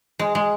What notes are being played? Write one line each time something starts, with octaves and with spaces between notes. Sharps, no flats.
G#3
G#3